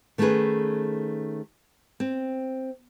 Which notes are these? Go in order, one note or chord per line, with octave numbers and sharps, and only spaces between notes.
D#3 A3 B3 C#4 G#4 B4
C4